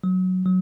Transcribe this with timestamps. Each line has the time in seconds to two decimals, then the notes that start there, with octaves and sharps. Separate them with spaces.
0.04 F#3
0.46 F#3